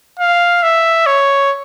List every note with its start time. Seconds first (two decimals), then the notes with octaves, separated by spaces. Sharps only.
0.20 F5
0.63 E5
1.07 C#5